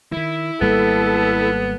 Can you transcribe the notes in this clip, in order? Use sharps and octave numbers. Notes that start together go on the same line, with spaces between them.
D#3 E3 E4
G#1 G3 A#3 B3 A4